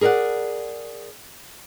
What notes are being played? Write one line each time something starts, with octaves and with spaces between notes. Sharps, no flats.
G#4 A#4 C#5 D5 F#5